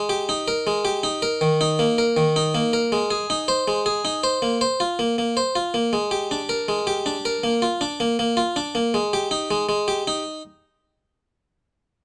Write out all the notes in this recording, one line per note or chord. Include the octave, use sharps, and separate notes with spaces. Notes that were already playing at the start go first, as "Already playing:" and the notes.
Already playing: G#3
G4
D#4
A#4
G#3
G4
D#4
A#4
D#3
D#4
A#3
A#4
D#3
D#4
A#3
A#4
G#3
G#4
D#4
C5
G#3
G#4
D#4
C5
A#3
C5
F4
A#3
A#3
C5
F4
A#3
G#3
G4
D4
A#4
G#3
G4
D4
A#4
A#3
F4
D4
A#3
A#3
F4
D4
A#3
G#3
G4
D#4
G#3
G#3
G4
D#4